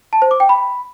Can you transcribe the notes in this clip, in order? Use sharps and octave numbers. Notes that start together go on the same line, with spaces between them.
A5
C5
D6
G5
B5